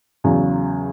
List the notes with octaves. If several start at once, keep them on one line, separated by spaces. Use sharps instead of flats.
E2 C#3 F#3